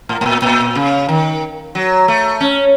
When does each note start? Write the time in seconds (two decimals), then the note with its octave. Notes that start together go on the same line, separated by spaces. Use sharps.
0.09 A2
0.21 A2
0.26 A#2
0.42 A#2
0.75 C#3
1.09 D#3
1.75 F#3
2.08 A3
2.41 C#4